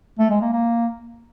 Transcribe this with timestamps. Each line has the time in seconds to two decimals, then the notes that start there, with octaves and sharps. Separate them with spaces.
0.19 A3
0.30 G#3
0.41 A#3
0.53 A#3